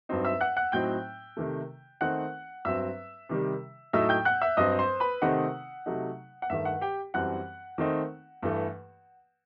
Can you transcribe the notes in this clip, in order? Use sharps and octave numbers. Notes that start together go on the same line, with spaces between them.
G2 F#3 C4 D#4
E5 E6
F#5 F#6
F#5 F#6
A2 F#3 C4 D#4 G5 G6
C3 D#3 A3
D#3 A3 C4 D#4 F#5 F#6
G2 F#3 C4 E5 E6
C3 D#3 G3
A2 F#3 A3 D#4 E5 E6
G5 G6
F#5 F#6
E5 E6
G2 F#3 C4 D#5 D#6
C5 C6
B4 B5
C3 D#3 A3 C4 D#4 F#5
C3 F#3 A3 D#4
F#5
G2 D#3 A3 E5
F#5
G4 G5
F#2 E3 G3 C4 F#5 F#6
D#3 A3 C4 D#4
G2 E3 A3